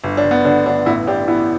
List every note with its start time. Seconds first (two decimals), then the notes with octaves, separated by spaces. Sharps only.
0.04 G1
0.17 D4
0.24 G1
0.31 B3
0.45 D3 D4
0.66 G1 D4
0.86 A1 B3 E4
1.07 A1 D4 G4
1.28 E3 B3 E4